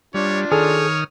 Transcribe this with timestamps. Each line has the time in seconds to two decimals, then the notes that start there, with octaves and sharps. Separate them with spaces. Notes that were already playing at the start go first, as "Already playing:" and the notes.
0.14 G3 D4 F4 C#5
0.52 D#3 G#4 A4 C#5 D#6 F6